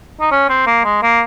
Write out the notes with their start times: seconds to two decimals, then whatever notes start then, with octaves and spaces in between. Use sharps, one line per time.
0.21 D#4
0.31 C#4
0.49 C4
0.67 A#3
0.84 G#3
1.03 A#3